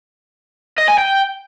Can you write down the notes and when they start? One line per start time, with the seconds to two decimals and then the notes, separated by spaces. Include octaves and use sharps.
0.78 D#5
0.88 G#5
0.98 G5